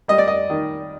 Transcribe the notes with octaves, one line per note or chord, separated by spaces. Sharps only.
G3 D#5
D5
D#5
D#3